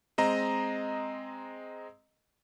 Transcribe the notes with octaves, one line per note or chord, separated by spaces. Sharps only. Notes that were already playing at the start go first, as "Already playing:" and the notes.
G#3 C4 D#5 A#5